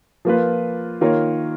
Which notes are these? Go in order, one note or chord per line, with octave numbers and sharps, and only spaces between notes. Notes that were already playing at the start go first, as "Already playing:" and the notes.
F3 A#3 F4 B4
D#3 A#3 F4 A#4 C#5